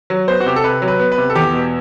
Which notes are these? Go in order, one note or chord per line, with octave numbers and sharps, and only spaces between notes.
F#3
B3 C5
F#4
C3 G4
A4
C3 B4
F#3
B4
B3
B4
C3
A4
E2 G4
B2